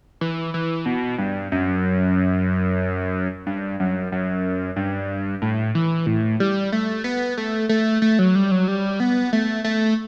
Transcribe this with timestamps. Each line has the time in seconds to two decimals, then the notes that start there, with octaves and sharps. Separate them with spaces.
0.21 E3
0.54 E3
0.86 B2
1.18 G2
1.52 F#2
3.47 G2
3.80 F#2
4.12 F#2
4.76 G2
5.42 A2
5.75 E3
6.06 A2
6.40 G3
6.72 A3
7.04 B3
7.38 A3
7.69 A3
8.02 A3
8.19 F#3
8.35 G3
8.51 F#3
8.68 G3
9.00 B3
9.33 A3
9.64 A3